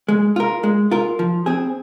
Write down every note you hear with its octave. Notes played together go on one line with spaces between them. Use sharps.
G#3
F4 A#4
G#3
F4 A#4
F3
C4 G#4